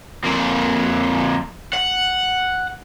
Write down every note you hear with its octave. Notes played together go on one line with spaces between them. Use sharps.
F2 A#3
F#5